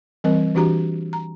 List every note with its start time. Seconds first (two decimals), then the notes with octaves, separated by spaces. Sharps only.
0.24 E3 G3 C4 A#4 D#5
0.55 E3 D4 F#4 G4 A#5
1.13 A#5